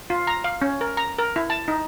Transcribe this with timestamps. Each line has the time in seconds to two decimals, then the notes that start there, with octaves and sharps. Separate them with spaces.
0.10 F4
0.27 A#5
0.44 F5
0.62 C#4
0.81 A#4
0.97 A#5
1.18 A#4
1.36 E4
1.50 A5
1.68 D#4